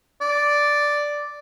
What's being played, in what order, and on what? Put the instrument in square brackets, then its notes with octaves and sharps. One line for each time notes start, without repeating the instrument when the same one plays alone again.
[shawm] D5